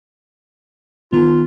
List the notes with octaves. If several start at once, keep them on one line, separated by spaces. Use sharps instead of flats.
D#3 B3 F4